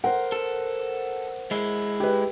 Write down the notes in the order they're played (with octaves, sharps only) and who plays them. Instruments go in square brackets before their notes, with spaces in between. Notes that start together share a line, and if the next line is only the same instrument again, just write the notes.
[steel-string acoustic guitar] A#4 C5 [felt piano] F#5
[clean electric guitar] A4
G#3 E4
[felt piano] G4 B4